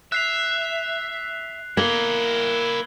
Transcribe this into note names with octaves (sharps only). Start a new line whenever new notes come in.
E5 F#6 C7 F7
A#3 E4 A#4 G#6 F#7 G7